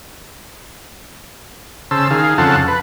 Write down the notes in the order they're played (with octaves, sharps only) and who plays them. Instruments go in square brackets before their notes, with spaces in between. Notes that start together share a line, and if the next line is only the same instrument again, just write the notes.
[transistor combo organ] C#3 C5 A5 E6
D#3 G#4 F5
F2 C#3 F4 A4 F#5 A5
B4